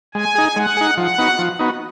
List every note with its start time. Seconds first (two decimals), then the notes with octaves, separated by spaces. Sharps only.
0.14 G#3 G#5
0.35 D#4 G#4
0.56 G#3 F#5
0.77 D#4 G#4
0.97 F3 F#5
1.18 B3 D#4 F#4
1.39 F3
1.59 B3 D#4 F#4